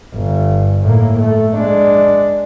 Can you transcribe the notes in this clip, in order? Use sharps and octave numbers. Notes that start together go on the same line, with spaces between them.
G1
A2 A#3
A3
G#3 D4